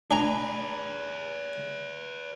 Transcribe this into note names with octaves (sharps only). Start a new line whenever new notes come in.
D4 G#4 B4 G#5 A#5